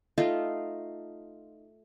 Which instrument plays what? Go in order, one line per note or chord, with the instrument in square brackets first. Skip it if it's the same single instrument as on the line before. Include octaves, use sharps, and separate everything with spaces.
[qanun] A3 D#4 F4 F5